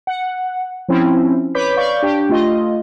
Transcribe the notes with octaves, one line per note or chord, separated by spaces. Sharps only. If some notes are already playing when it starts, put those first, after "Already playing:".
F#5
F3 C4 C#4 E4
B4 C#5 B5 D6 G6 B6
D5 F5 C#6 G6
D4 G4 G5
A3 F4 D#5